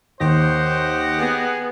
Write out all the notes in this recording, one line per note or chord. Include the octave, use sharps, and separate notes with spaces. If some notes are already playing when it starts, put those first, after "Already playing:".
D#2 G4 C5 D#5 F#5
B3 G#4